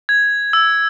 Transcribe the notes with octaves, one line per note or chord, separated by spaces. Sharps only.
G#6
E6